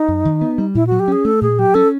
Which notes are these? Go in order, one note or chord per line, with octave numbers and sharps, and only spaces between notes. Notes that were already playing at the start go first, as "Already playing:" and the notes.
Already playing: D#4
F#2
D#3
B3
G3
A#2 E4
F#3 F#4
G4
C#4 G#4
A3 A4
A#2 G#4
F#3 G4
C#4 A4